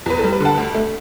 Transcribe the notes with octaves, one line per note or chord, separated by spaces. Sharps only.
E2 B4
A4
G3
B4
D3 F#5 A5
D2
A3